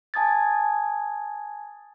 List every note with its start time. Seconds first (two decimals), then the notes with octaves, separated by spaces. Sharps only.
0.14 G#5 A5 D#6 G#6 A6